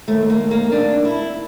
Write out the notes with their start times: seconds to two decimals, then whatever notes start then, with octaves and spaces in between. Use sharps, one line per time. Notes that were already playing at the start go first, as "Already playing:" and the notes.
0.08 D#2 D#3 A3
0.30 A#3
0.51 A#3
0.72 D4
1.05 E4